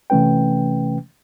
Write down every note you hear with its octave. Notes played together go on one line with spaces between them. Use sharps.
C3 E3 A3 C#4 B4 G5